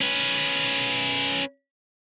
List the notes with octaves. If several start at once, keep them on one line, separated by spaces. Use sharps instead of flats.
C#4 B4